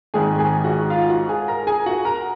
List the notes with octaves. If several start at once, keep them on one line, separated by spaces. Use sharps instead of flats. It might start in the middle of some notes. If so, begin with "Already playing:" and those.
G#1 G#2 D#3 G#4 G#5
G#4 G#5
F#4 F#5
F4 F5
F#4 F#5
G#4 G#5
A#4 A#5
G#4 G#5
F#4 F#5
A#4 A#5